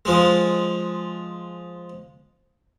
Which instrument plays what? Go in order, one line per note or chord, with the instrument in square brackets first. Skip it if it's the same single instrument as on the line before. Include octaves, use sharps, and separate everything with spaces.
[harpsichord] F3 G#3